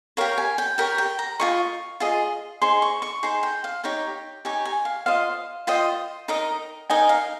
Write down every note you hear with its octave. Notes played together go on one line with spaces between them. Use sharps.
G4 A#4 C#5 F5
G#5
G5
G4 A#4 C#5 G5
G5
A#5
F4 G#4 D#5 C#6
F4 G#4 D#5
D#4 G#4 C5 C6
C#6
C#6
D#4 G#4 C5 C6
G5
F5
D#4 G4 C#5 G5
D#4 G4 C#5 G#5
G#5
F5
F4 C5 D#5 F5
F4 C5 D#5 G5
D#4 A#4 D#5
D#4 A#4 D#5 G#5
F5